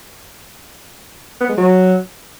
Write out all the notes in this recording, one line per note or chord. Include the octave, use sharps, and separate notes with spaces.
B3
G#3
F#3